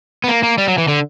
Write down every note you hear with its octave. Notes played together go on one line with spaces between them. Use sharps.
B3
A#3
A#3
G3
F#3
E3
D3